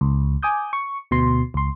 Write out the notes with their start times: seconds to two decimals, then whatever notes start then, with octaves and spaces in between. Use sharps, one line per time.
0.01 C#2
0.43 G#5 D6 D#6 G6
0.73 C#6
1.11 D2 B2 C6
1.54 C#2 C6